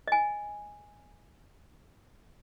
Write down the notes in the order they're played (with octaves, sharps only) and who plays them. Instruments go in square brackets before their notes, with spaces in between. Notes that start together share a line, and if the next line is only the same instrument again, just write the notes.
[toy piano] D#5 G#5